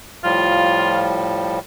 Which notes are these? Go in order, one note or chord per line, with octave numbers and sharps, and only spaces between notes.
A2 F3 G3 F4